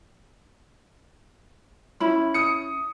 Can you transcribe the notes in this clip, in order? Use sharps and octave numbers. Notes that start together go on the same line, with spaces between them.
C#4 E4 B5
D#6 C#7